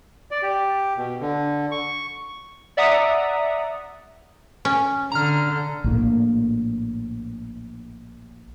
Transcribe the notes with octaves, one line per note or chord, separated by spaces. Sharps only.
D5
G4
B2
D3
C#6
D5 E5 F#5 A#5 D#6
C#4
D3 A#5 F6
A#1 A2 A#3